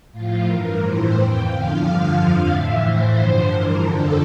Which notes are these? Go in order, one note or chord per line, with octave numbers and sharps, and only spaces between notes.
A2 F3 F4
G2 E3 A#4
A2 E3 C5
F2 E3 G5
E2 D3 F3 F5
G2 D3 F3
F2 D3 F3
A2 E3 E5
A2 E3 C5
G2 D3 F3
G2 E3 A#4
F2 D3 F3 A4